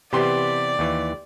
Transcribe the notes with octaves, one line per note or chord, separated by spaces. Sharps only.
C3 E3 B3 G4 D5 C6
D#2 E3